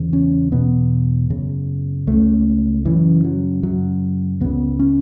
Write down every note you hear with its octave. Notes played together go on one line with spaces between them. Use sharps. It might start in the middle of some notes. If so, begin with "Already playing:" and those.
Already playing: E2 C#3
C#4
E2 B2 B3
F#2 C#3
C#2 C#3 A3
F#2 C#3 E3
F#3
F#2 C#3 F#3
C#2 C#3 B3
C#4